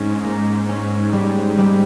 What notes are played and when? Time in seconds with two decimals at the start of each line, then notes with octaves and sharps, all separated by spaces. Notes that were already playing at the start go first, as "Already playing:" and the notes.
Already playing: G#2 C#4
0.24 A#3
0.69 C#4
1.13 G3
1.58 G3